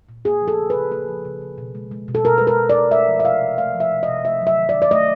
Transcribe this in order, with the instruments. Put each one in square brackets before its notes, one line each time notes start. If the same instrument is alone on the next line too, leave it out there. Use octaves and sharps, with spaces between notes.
[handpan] A#2
A#3 G#4
F3
A4
C#3
B4
C#3
A#3 A4
F3
C#3
C#3
B2
G#3
G#3
B2
A4
B2 A#4
G#3 B4
A#4
G#3
B2 D5
A3 E5
F3
E5
C3 F5
C3
A3 F5
F3
E5
C3
D#5
C3
A3 E5
F#3
E5
D#3
D5
D#3
D5
A3 D#5